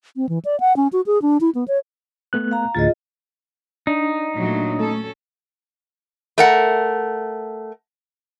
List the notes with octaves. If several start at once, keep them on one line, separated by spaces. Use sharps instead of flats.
C4
E3
D5
F#5
C#4
F#4
G#4
D4
E4
B3
C#5
A3 B3 F#6
F5 A#5
D2 A2 F4 G#4 D#5 A6
D4 D#4
A#2 F#3 A3
A3 C#4 A4
A3 A#4 F#5